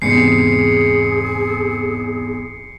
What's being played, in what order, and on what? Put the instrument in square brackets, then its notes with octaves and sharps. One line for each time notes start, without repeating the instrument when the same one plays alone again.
[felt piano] E2 G#2 C3 [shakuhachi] G#4 [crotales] C7 C#7